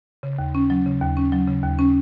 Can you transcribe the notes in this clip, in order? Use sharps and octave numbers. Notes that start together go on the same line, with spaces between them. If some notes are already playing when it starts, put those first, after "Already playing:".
C#3
D#2
C#4
F#3
C#3
D#2
C#4
F#3
C#3
D#2
C#4